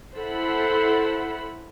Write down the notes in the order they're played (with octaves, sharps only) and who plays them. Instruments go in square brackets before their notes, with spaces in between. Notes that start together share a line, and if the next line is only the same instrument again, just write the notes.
[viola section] E4 A4 C5 F#5 B5